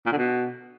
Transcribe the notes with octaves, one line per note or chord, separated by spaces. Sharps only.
A#2
D3
B2